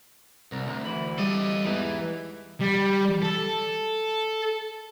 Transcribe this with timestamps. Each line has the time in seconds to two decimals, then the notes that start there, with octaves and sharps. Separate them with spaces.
0.52 C2 A#4
0.67 D2
0.84 E3 B5
1.18 G3 A4 D#5
1.65 E2 G#2 E3
2.61 G3
3.22 A4